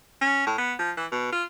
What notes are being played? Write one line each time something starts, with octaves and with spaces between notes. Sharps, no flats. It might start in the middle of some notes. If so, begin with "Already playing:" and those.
C#4
A2
B3
F3
E3
B2
F4